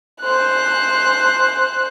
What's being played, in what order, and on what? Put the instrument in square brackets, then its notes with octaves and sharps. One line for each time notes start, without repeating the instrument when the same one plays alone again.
[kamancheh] C5 F#6